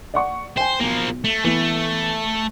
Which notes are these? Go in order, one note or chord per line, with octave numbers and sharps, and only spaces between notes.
D5 F#5 C#6
C5 G5 G#5
B1 F3 A#3
A3
E3 A3 B3